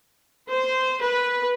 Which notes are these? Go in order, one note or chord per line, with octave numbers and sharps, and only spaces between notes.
C5
B4